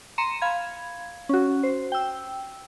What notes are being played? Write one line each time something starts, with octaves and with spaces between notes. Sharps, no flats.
A#5 C6 C#7 D#7 E7
F5 B5 G#6
C#4 F#4
C5
G5 E6